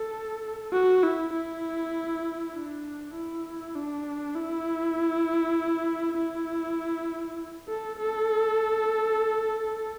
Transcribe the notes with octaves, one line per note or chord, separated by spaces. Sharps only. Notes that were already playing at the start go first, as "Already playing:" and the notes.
Already playing: A4
F#4
E4
E4
D4
E4
D4
E4
E4
A4
A4